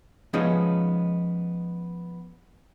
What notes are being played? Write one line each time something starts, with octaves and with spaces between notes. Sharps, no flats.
F3 G#3 B3 C#4 D#4